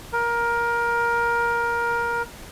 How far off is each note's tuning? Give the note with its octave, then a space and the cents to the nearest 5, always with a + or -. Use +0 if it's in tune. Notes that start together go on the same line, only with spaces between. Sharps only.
A#4 +15